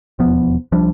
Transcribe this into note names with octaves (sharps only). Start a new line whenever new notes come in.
E1 D#2 F3 B3
C2 F3 G3 D4